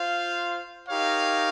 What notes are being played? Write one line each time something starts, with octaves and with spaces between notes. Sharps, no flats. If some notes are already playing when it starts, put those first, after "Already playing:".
Already playing: F4 C5 F5
D#4 G4 A#4 C#5 F5